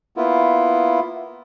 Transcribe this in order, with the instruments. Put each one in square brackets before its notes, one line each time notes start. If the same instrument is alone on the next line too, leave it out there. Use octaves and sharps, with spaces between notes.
[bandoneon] A#3 B3 E4 F4